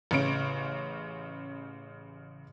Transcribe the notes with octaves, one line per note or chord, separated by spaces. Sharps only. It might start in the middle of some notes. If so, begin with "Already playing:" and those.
A1 C#3 D7